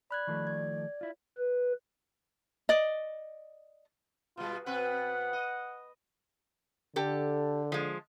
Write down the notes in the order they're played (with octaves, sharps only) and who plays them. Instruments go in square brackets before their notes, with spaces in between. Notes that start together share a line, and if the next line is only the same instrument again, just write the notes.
[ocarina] D5 [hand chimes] B5 F#6 G#6
[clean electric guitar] D#3 F3 A3
[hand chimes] G#6
[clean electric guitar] E4 F4
[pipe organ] B4
[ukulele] D5 D#5
[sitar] B2 G3 [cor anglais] F4
[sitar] B2 C4 B4 [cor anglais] F#5
[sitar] D#5
[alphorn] D3 [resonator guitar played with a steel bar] G4 A4
[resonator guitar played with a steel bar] F3 G#3